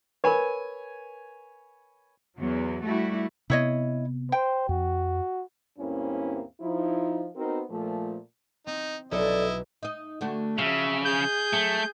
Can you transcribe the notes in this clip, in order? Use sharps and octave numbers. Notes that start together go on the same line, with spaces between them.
A#4 B4 C#5 G#5 B5
E2 F#3
G3 A3 E4 F#4
C3 B3 E4 C#5 D#5
C5 G5
F2 F#4
D2 G2 A#3 C4 C#4 E4
F3 D#4 E4
B3 C4 D#4 F#4 A#4 C5
A#2 F3 A3
C4 D#4
B1 C#4 E4 A4 D5 D#5
D#4 D#5
D3 A3 F#4
C#3 F3 F#3 E5
G#4 G6
F#3 A3